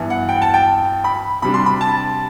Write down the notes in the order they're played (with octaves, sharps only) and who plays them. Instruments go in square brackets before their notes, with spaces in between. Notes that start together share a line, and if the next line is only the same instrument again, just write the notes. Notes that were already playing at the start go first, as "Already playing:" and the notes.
Already playing: [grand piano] G2 E3 B3 E4
F#5
G5
A5
G5
B5
C3 G3 D4 B5
C6
B5
A5